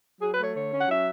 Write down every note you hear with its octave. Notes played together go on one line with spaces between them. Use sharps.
F#3 G#4
B4
A3
C#5
D3 C#5
C#4
F#5
F#3 E5